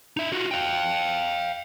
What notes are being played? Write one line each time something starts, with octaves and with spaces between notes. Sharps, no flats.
D#4 E5
F4 F#4
F5 G5